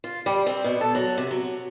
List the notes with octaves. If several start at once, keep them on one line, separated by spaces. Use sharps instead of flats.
F4
G3
C4
B2
A4
F#3
C3
F#3